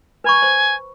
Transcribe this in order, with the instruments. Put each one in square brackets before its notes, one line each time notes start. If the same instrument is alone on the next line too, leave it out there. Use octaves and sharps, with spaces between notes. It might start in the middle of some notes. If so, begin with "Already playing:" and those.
[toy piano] B4 B5 C#6 [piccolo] G#5
[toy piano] C5